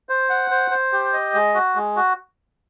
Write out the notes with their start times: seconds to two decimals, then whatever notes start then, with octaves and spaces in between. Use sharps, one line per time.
0.09 C5
0.30 F#5
0.51 C5
0.71 C5
0.93 G4
1.13 D#5
1.34 G#3
1.55 F#4
1.76 G#3
1.96 F#4